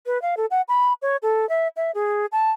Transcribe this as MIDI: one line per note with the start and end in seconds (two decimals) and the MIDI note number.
0.06 0.21 71
0.22 0.35 77
0.37 0.46 69
0.51 0.61 78
0.68 0.93 83
1.02 1.17 73
1.22 1.48 69
1.49 1.68 76
1.76 1.91 76
1.95 2.26 68
2.32 2.51 81